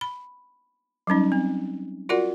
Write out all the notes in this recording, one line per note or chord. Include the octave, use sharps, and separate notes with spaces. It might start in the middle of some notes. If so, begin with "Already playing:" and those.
B5
F#3 G3 C#4 D#4
C4
F4 F#4 A#4 D5 F#5